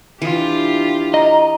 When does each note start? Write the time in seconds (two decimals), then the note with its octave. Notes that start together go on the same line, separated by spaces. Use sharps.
0.22 E3 D4 F4 G4
1.14 D#5 A#5